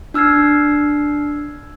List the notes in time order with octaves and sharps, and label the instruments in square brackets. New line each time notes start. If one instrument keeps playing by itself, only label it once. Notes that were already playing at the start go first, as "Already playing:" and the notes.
[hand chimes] D4 E6 F6 G#6 C7